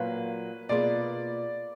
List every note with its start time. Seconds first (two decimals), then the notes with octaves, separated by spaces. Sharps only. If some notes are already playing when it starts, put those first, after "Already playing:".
Already playing: A#2 F#3 A#3 F4 B4
0.69 B2 A#3 F4 G#4 B4 D5